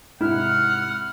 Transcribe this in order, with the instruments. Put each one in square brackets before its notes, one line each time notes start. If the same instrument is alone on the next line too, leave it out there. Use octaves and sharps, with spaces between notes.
[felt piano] G#2 C3 [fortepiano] E4 [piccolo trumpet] F#5 [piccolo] F6